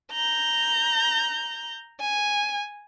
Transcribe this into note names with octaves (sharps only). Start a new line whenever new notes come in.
A#5 G6
G#5